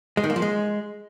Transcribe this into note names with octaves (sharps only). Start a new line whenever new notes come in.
G#3
D#3
A#3
F3
G#3